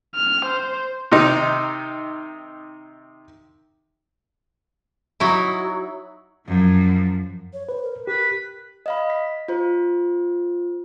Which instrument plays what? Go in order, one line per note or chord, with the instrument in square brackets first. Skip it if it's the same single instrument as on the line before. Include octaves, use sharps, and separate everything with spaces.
[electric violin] F6
C5
[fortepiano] C3 D#3 D#4
[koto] F#3 D#4 E4
[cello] F#2 F3
[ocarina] C#5
[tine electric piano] B4 [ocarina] C5
[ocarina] A#4
[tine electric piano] G4 [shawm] B4
[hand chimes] D#5 F5 B5
B6
F4 C5